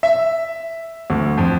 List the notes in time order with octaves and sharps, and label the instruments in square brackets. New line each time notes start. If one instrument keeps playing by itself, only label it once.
[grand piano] E5
D2
F2